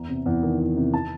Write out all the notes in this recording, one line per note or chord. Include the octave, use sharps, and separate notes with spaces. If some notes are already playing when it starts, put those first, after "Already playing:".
Already playing: E2 E3 A#5
C3
E2
D#3
E2
C3
A5